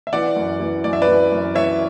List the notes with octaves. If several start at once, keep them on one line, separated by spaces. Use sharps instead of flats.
E5
E3 D5 F#5
F#2
E3
F#2 D5
E5
B4 D5
E3
F#2
E3 C#5 E5